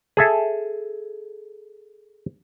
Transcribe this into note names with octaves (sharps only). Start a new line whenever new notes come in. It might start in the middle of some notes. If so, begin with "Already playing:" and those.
G#4 A4 E5